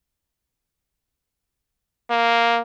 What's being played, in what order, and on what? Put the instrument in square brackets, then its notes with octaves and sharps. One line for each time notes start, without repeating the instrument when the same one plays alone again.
[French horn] A#3